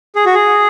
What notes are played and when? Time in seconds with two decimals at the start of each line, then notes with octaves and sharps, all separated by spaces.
0.15 G#4
0.25 F#4
0.34 G#4